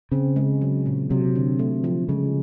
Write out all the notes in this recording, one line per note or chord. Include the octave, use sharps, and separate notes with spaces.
C#3 C4
G#3
F#3
A#2
C3 F#3
D3
A3
F3
C#3 G#3